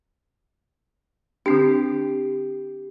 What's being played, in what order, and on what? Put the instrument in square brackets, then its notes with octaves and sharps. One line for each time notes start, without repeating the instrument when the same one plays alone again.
[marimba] D3 C4 D4 [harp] G4